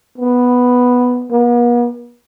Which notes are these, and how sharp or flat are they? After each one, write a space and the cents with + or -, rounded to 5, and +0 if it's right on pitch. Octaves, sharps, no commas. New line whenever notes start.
B3 +0
B3 -45